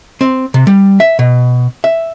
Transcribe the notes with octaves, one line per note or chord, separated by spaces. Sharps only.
C4
C3
G3
E5
B2
E5